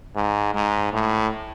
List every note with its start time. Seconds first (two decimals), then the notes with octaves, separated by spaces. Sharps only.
0.15 G#2
0.54 G#2
0.93 A2